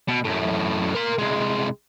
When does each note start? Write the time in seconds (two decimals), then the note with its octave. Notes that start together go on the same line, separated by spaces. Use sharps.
0.08 B2
0.25 F#2 A2
0.95 A#4 C6
1.19 C2 G#3